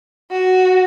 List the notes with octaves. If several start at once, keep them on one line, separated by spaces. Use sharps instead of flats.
F#4